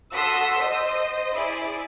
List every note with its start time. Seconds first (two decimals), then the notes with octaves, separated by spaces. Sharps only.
0.13 F#4 A4 C6 D#6 E6 B6
0.59 C5 D#5
1.35 E4 G#4 D5